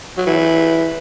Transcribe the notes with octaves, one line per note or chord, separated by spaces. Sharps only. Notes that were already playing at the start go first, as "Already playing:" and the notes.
F#3
E3